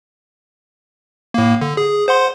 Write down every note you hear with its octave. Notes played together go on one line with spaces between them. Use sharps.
A2 A#3
D3
G#4
C5 F#5 C6